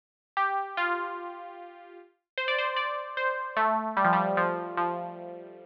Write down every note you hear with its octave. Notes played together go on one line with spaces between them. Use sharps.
G4
F4
C5
D5
C5
D5
C5
A3
G3
F3
G3
F3
F3